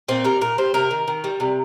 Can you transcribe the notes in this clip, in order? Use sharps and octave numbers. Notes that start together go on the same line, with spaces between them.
A#2 C4
G3 A#4
A#2 A#4
G3 C5
C3 A#4
D#3
D#3
G3
C3